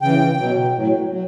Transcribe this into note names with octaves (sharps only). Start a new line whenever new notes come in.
C#3 E3 G5
B2 F#3
A2 F#3
F#3